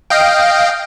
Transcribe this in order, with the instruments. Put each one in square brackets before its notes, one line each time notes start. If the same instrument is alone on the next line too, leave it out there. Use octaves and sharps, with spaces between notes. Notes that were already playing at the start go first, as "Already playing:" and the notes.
[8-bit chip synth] D#5 F5 G5